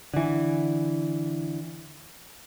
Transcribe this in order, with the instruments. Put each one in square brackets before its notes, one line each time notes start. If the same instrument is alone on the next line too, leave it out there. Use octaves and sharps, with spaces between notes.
[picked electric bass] D3 E3